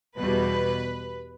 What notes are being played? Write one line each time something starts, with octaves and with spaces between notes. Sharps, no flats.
E2 B2 G3 B4